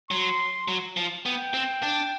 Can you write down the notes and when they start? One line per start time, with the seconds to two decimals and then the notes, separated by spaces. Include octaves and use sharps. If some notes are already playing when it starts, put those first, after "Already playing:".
0.11 F#3 C6
0.68 F#3
0.97 F3
1.26 B3 G5
1.54 C4
1.83 D4